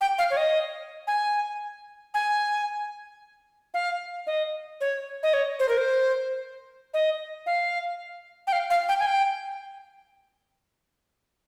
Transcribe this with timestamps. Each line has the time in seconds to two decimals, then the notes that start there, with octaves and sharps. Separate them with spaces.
0.01 G5
0.18 F5
0.31 C#5
0.37 D#5
1.07 G#5
2.14 G#5
3.74 F5
4.27 D#5
4.81 C#5
5.23 D#5
5.33 C#5
5.60 C5
5.69 A#4
5.78 C5
6.94 D#5
7.46 F5
8.47 G5
8.53 F5
8.70 F5
8.89 G5
9.00 G#5
9.06 G5